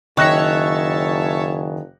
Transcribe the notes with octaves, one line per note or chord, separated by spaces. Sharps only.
F#1 D#3 C#5 E5 A5 C#6 F#6 A#6